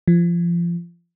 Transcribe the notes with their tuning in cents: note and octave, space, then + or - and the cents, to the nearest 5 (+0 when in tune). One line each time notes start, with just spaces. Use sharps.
F3 -25